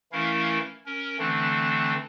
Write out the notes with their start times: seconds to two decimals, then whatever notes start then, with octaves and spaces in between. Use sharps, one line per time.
0.12 E3 A3 C#4 E4 A#4 F5
0.86 C#4 A#4
1.19 D3 E3 A3 C4 D4